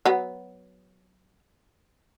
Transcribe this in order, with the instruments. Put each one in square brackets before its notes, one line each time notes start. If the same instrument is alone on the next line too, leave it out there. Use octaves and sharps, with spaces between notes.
[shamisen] F#3 B3